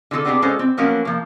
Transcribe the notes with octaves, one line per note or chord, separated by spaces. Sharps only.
D3 F4 F#4 A4
B3 C4 D4 D#4 G4 G#4
G#3 C#4 F4 A4 C5
C4
F3 F#3 A#3 B3 C#4
F3 A#3